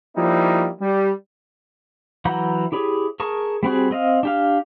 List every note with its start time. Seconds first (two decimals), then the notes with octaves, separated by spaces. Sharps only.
0.17 F3 G3 A#3 D#4 E4
0.79 G3
2.25 E3 F#3 F#5 A#5 G6
2.72 E4 G4 G#4 C#5
3.20 G#4 A#4 A5 C#6
3.63 G3 C4 F#4 G#4
3.91 C4 D#5 F5
4.23 D4 G4 F5